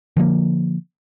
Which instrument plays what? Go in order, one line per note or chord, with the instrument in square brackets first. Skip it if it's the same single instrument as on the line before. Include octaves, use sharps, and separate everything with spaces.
[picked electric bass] D3 F3 G3 A#3